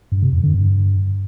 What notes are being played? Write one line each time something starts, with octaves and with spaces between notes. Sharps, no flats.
G2
C3
F2
D3
G2